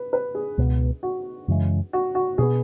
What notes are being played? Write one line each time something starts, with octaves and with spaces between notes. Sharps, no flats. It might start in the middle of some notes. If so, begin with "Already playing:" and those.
Already playing: B4
B4
G#4
C#2 B2 B3
F#4
F#2 C#3 E3 G#3
F#4
F#4
B2 B3 G#4